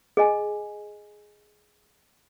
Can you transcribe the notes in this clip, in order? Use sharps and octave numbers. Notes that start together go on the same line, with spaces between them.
G#4 D#5 G#5